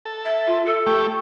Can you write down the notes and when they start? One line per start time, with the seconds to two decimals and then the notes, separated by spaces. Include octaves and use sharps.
0.05 A4
0.25 E5
0.47 F4
0.66 A4
0.86 A3 G4 C#6